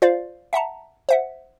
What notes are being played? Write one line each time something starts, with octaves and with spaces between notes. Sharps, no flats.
F4 C5 D5 F5
E5 F#5 A5 A#5
C5 E5 F#5